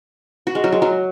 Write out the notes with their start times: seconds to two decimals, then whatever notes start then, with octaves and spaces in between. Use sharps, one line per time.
0.47 F#4
0.55 G#3
0.64 F#3
0.72 G#3
0.82 F#3